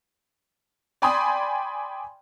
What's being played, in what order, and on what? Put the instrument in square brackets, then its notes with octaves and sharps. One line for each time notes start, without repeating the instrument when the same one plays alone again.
[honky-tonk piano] D5 G5 G#5 B5 C6 D#6